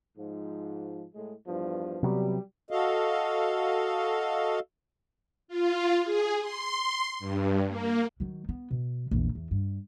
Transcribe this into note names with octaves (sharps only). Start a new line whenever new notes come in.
G#2 F3
A2 G#3
E2 G2 F3
C3 F#3 G3 B3 G4
F#4 A4 D#5 F5
F4
G#4
C6
G2
A#3
D#3 F#3
B3
B2
A#1 E2
E2
G2